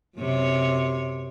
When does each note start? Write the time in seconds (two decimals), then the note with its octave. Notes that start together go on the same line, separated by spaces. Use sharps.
0.17 F#2 C3 C#5